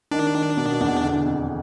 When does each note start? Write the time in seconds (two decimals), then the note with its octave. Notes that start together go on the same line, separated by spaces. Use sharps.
0.11 D#3 D4
0.35 D#3
0.57 B2
0.80 E2
1.03 D3
1.26 F2